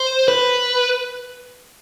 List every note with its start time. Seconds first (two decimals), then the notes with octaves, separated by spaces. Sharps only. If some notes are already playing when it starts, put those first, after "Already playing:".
Already playing: C5
0.28 B4